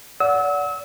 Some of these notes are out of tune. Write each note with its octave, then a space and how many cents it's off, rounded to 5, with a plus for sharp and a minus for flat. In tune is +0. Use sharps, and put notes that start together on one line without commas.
D5 -35 F#5 -10 E6 -35